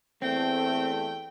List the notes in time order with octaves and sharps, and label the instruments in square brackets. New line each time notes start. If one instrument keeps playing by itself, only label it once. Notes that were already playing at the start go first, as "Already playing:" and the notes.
[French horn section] E2 A3 [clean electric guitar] C4 [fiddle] G5